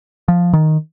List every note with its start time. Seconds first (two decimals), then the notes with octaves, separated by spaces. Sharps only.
0.28 F3
0.53 D#3